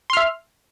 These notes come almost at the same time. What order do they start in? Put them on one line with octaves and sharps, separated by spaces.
C6 F6 E5